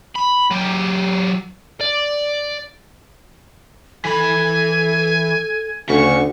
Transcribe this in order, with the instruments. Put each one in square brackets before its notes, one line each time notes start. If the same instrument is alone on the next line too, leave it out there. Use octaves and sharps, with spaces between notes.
[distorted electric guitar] B5
F#3 G4
D5
[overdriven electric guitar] E3 B5 [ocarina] A4 [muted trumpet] G#5
[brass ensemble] D2 [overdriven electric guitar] C#3 [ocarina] F#5 [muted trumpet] C#6